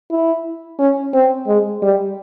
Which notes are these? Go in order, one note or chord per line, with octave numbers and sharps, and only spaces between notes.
E4
C#4
C4
G#3
G3